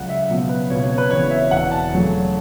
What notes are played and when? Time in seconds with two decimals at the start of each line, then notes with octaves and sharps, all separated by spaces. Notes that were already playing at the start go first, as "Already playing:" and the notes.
Already playing: C#2 C#3 F#3 F#5
0.09 E5
0.29 C#2 B2 F#3 B3
0.49 B4
0.70 C#2 B2 B3 C#5
0.84 C#5
0.98 B4
1.11 E1 E2 C#3 E3 B3 C#5
1.31 E5
1.51 E1 E2 E3 F#5
1.72 A5
1.92 E2 C#3 F#3 A3